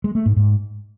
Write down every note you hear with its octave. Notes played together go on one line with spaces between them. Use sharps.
G#3
A3
G#2
G#2